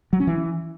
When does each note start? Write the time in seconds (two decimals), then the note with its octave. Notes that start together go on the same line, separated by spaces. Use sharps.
0.13 F#3
0.20 C#4
0.27 E3